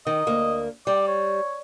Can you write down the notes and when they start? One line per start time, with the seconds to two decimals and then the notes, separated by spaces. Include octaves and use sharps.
0.07 D#3 D#5
0.27 D2 A#3
0.87 G3 D5
1.08 C#5